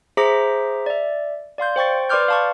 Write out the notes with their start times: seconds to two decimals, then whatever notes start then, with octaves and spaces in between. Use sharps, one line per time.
0.17 G#4 C5 E5 A#5 D6 B6
0.86 D5 E5
1.58 D5 F5 C6 G6
1.76 C5 G5 C#6 A6
2.09 B4 D5 C6 D6 F6 G6
2.28 F5 A5 C#6